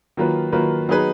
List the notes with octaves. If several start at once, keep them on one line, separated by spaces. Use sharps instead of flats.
D#3 F#3 A#3 F4 B4
D#3 F#3 A#3 F4 B4
F#3 B3 D#4 G#4 B4